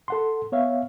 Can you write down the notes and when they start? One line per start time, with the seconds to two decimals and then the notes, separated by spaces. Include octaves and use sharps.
0.08 A4 F#5 C6
0.52 B3 C#5 E5 F5